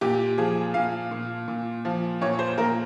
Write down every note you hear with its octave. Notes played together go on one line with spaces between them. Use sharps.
A#2 G4
F3 G#4
A#2 F5
A#2
A#2
F3
A#2 C#5
C5
A#2 A#4